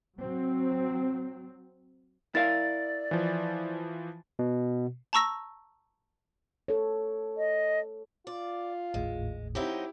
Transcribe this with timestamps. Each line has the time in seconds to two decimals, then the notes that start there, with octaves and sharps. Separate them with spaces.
0.20 F#3 C4
2.35 E4 A#4 D5 F5 A6
3.11 E3 F3
4.39 B2
5.13 A5 A#5 C#6 E6 A#6
6.68 A4 C#5
7.37 D#5
8.27 F4 D5
8.94 G#1 D#2 A2 G#3
9.55 F#3 C4 D#4 E4 G4